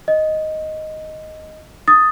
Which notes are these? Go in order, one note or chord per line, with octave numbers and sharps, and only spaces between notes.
D#5
D#6 A6